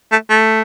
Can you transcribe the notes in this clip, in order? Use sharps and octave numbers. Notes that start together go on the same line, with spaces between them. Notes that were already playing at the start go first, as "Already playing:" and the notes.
A3
A3